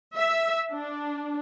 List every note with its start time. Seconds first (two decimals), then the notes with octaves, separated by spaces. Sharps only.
0.16 E5
0.72 D4